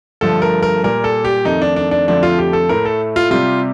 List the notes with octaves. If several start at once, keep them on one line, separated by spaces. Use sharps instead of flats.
G2 D3 F3 A3 A4
A#4
A#4
A#2 G3 A#4
A4
G4
F2 D#3 A3 D#4
D4
D4
D4
F2 D3 F3 A3 D4
F4
G4
A4
A2 A3 A#4
A4
F4
C3 G3 F4